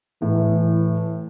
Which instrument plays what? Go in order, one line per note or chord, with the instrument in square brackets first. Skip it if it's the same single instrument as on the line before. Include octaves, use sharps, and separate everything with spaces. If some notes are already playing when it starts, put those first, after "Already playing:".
[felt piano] A2 [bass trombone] E3